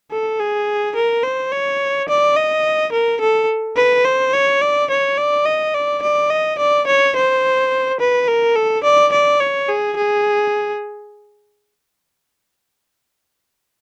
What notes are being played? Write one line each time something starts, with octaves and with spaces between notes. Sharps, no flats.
A4
G#4
A#4
C5
C#5
D5
D#5
A#4
A4
B4
C5
C#5
D5
C#5
D5
D#5
D5
D5
D#5
D5
C#5
C5
B4
A#4
A4
D5
D5
C#5
G#4
G#4